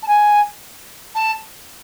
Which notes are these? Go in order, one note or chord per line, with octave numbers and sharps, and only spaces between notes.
A5
G#5
A5